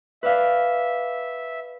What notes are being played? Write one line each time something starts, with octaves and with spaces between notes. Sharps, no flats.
B4 D5 E5 F5